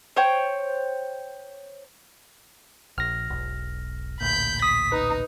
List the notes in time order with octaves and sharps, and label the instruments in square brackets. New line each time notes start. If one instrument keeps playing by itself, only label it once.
[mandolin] C5 C#5 G5
[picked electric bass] A#1 [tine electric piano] F6 A#6
[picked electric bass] E1 B1
[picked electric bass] A1 D2 A#2 [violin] B5 G6
[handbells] D#6 [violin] B6
[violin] D#4 [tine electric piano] B4